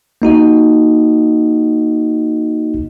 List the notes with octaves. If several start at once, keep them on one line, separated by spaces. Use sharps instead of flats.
A#3 D#4 F#4 D#5